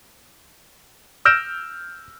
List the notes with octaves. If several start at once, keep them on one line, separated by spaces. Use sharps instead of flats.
E6 F6 G6 A#6 D7 E7